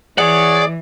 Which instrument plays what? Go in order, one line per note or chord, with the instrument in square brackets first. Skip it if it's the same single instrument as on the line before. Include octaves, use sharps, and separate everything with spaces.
[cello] E3 [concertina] G#4 [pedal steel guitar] C#5 F#5 [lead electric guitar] D5